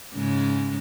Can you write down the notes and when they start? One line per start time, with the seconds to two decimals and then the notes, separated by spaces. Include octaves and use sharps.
0.14 G#2 C#3 G#3